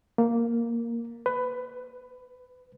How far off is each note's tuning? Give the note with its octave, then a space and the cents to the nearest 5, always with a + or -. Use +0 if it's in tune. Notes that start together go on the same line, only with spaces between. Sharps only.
A#3 +0
B4 +15